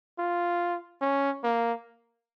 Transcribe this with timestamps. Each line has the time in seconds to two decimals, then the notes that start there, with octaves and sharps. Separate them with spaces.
0.19 F4
1.02 C#4
1.44 A#3